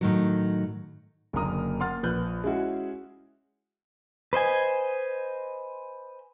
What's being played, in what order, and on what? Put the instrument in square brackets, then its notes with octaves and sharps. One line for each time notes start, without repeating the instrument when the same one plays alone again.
[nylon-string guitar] A2 D#3 F#3
[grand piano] F#1 D3 A#3 A#5 D#6
A#3 F#5 C6 F6 A6
A#1 B4 F#6 G6
G#3 C#4 E4 F#4 G#4
[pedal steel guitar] B4 C5 D#5 G#5